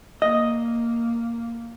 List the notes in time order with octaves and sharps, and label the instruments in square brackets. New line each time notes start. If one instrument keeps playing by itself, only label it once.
[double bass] A#3 [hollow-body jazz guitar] D#5